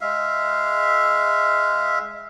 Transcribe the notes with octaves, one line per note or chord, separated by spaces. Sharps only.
G#3 E5 F5